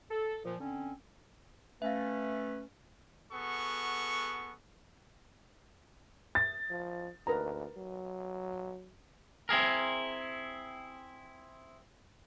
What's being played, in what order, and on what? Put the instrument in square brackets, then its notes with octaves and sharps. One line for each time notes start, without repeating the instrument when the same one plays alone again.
[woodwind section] A4
A#2 F3
D3 C4 C#4
[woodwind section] A3 C#4 [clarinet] B4 [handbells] E5 F5
[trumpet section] B3 F#4 G#4 A4 C#6
[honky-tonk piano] A6
[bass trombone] F3
[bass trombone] D2 [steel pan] A#4 B4 A#5
[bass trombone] F#3
[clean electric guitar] C4 E4 G#4 A#4